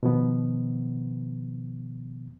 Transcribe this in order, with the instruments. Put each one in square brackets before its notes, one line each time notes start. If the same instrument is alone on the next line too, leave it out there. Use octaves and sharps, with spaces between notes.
[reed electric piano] B2 D#3 F3 B3